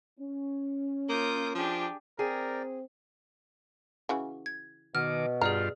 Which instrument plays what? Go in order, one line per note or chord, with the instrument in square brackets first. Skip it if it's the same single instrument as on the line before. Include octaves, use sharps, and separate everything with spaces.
[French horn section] C#4
[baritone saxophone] A#3 [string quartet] F4 D#6 G6
[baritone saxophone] F3 [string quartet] D4 G4 G#4
[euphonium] C4 [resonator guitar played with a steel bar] G#4 [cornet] A#4 [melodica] D5 G5
[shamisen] C#3 E3 F#4
[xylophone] G#6
[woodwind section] B2 [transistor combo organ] D#3 D6 [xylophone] F6
[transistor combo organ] G2 F4 [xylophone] G#4 D5 F6 [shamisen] A#5